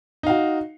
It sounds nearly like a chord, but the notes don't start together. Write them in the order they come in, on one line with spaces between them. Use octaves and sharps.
D#4 F5 F#4